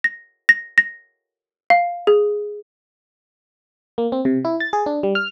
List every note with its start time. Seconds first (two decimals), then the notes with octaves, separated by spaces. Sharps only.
0.04 A#6
0.49 A#6
0.78 A#6
1.70 F5
2.07 G#4
3.98 A#3
4.12 C4
4.25 C3
4.45 E4
4.60 A6
4.73 G#4
4.86 D4
5.03 G3
5.15 F6